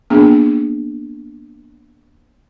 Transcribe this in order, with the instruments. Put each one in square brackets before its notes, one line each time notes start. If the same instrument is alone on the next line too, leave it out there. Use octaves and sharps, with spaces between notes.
[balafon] A#3 B3 D4 G#4